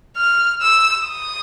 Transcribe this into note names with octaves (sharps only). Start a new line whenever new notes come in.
F6
E6
D#6